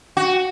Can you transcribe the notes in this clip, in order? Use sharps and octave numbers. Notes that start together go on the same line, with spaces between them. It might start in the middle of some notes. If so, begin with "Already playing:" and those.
F#4